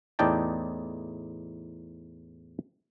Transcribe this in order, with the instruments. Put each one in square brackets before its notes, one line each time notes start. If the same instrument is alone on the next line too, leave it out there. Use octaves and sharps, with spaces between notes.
[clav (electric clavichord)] E2 A2 D#4 D5 G5 A5